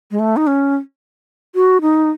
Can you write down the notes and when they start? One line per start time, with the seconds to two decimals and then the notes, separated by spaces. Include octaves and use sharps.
0.11 G#3
0.19 A3
0.37 D#4
0.47 C#4
1.55 F#4
1.81 D#4